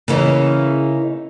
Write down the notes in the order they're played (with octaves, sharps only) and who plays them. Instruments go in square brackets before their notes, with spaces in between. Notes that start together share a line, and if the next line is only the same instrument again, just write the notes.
[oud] C#3 E3 [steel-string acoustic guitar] A#3 C#4 D#4